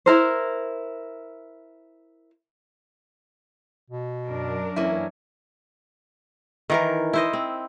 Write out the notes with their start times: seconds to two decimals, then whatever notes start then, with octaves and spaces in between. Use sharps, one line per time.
0.06 E4 A#4 C5
3.90 B2
4.30 F#2 D4 A#4
4.76 E3 A#3 C#4 E4
6.70 D#3 E3 A#4
7.13 E4 C5 D#5
7.33 C4